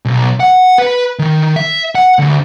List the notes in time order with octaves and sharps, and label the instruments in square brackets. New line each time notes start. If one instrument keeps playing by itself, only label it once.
[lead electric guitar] B1
F#5
B4
D#3
E5
F#5
D2